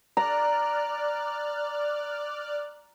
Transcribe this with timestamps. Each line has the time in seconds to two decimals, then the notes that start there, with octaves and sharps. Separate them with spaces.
0.17 D5 A#5 F6 F#6